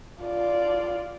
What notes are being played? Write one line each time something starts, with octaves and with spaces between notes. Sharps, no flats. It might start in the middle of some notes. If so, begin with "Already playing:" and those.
F4 D5